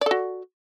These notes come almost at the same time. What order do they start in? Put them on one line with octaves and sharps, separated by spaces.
D5 A4 F#4